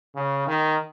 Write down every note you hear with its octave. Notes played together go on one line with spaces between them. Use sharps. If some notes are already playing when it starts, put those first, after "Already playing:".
C#3
D#3